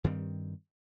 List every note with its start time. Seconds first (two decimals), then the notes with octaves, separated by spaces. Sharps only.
0.04 G2 D#3 G3 C4